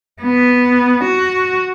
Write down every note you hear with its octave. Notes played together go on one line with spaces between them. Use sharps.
B3
F#4